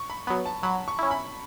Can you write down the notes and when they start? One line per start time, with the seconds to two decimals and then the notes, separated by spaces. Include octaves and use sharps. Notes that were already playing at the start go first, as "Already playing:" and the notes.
Already playing: C#6
0.10 B5
0.27 F#3 B3 B5
0.46 A5
0.63 F#3 B5
0.88 C#6
0.99 C#4 E4
1.11 B5